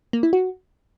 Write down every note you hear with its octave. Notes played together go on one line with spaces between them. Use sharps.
A#3
E4
F#4